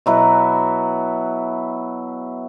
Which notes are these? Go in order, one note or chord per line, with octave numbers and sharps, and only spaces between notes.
B2 F#3 E4 B4